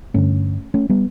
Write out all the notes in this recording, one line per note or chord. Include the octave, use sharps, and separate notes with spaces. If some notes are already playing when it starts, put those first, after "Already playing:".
G2 D3 A3 C#4
A3 C#4
G3 B3